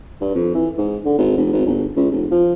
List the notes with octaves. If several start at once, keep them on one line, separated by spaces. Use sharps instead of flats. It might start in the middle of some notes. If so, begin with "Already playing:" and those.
G2
F2
E3
G#2
D3
G#1
F1
G#1
G1
C#2
F1
F3